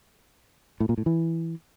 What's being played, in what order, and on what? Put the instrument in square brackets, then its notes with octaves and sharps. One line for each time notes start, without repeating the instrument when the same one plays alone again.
[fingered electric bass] A2
A#2
A2
E3